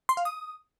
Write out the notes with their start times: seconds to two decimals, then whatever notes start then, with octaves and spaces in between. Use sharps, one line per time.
0.09 C6
0.17 F5
0.25 D#6